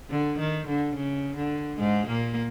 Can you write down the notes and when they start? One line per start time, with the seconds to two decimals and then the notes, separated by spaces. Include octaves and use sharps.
0.10 D3
0.39 D#3
0.67 D3
0.95 C#3
1.36 D3
1.79 G#2 G#3
2.07 A#2 A#3